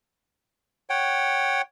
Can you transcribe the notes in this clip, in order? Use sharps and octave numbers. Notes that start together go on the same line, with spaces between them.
C#5 F#5 G5